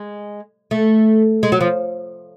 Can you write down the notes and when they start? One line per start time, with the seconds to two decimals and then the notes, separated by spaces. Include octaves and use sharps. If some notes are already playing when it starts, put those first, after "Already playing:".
Already playing: G#3
0.71 A3
1.43 G#3
1.52 F#3
1.61 F3